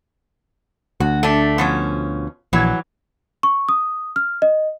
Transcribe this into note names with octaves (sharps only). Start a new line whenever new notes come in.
D2 F#4
A3 D4
B2 F3 C#4
A#1 E3 F#3
C#6
D#6
F6
D#5